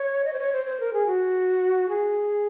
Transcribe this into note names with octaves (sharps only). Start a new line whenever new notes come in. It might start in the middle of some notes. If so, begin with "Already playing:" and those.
Already playing: C#5
D#5
C5
C#5
C5
C5
A#4
G#4
F#4
G#4